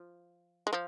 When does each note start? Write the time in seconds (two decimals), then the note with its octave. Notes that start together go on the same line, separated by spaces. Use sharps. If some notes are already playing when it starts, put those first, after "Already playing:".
Already playing: F3
0.67 G#3
0.73 F3